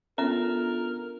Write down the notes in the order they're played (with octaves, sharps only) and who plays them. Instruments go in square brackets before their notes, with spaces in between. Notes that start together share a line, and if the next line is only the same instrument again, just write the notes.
[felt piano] B3 D4 [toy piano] C#4 E5 A#5 [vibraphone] F4 A4 [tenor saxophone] A#4